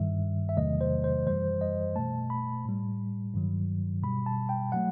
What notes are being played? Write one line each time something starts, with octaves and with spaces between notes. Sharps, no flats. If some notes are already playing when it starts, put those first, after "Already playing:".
Already playing: G2 D#3 G3 E5
E5
E2 C3 D#3 F#3 A3 D#5
C5
C5
F#2 E3 G3 C5
D#5
B2 A3 A5
B5
A2 G3
G2 D#3 F#3
B2 G3 B5
A5
G5
F#3 A3 F#5